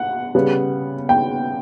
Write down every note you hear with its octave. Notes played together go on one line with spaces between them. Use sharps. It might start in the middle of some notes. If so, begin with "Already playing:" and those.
Already playing: F#5
C#3 G3 B3
G5